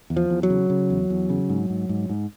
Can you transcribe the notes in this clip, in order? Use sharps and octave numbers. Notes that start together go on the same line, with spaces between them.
E2
F3
E2
F#3
C#3
C#3
E2
E2
C#3
G#2
G#2
G#2
G#2